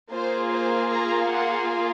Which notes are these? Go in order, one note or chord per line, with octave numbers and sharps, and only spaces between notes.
A#3 F4 G#4 C5
C5
A#5
F#5